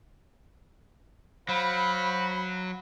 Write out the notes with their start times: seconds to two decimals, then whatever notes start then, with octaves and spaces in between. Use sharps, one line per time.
1.49 F#3 C5 F5 B5